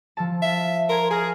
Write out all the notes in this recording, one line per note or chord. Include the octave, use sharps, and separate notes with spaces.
F3 A4 A5
E5 F5
A#4 C6 G#6
G#4 G#5 F6 A#6